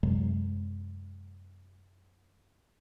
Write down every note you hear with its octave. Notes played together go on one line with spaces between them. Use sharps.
F#2 C3 F#3 G#3